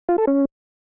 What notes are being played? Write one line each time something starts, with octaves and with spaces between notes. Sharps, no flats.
F4
A4
C#4